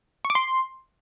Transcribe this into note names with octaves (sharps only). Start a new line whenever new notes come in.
C#6
D6
C6